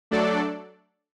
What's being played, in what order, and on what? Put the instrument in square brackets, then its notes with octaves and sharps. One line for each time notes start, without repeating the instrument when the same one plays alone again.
[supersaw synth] F#3 A3 D4 A4 D5